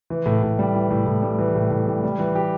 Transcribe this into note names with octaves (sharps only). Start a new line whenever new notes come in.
E3
A2
A2
G3
E3
A2
A2
G3
E3
A2
A2
G3
G3
E3
G4